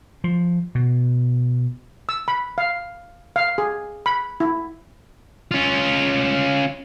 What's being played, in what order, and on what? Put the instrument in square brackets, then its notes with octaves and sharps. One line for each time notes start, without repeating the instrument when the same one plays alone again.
[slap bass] F3
B2
[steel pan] E6
B5
F5
F5
G#4
B5
E4
[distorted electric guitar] C#4 F4